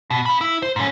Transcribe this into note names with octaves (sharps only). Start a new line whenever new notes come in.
B2
F5 B5
E4
C5
G#2 C#4